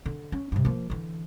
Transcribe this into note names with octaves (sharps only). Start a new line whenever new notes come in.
D3
C#4
G2 C3
F3 A#3
D3 E3